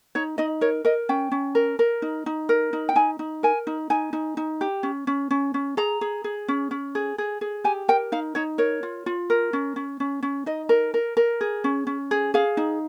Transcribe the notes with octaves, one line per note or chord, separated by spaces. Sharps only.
D#4 C#5
D#4 D#5
A#4 C#5
A#4 D#5
C#4 G5
C#4
A#4
A#4
D#4
D#4
A#4
D#4
G5
D#4 G#5
D#4
A#4 G#5
D#4
D#4 G#5
D#4
D#4
G4
C#4
C#4
C#4
C#4
G#4 A#5
G#4
G#4
C#4
C#4
G#4
G#4
G#4
G4 G#5
A#4 G5
D#4 F5
D#4 C#5
A#4 C#5
F4
F4
A#4
C#4
C#4
C#4
C#4
D#4 D#5
A#4
A#4
A#4
G#4
C#4
C#4
G#4
G#4 F5
D#4